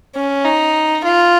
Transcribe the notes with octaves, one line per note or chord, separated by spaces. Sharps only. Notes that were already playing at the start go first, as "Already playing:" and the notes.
C#4
D#4
F4